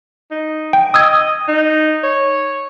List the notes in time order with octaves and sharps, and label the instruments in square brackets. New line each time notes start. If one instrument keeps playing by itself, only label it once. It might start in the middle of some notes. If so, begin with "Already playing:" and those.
[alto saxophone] D#4
[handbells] G5
[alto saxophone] D#5 [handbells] D#6 E6 G#6
[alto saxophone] D#4
C#5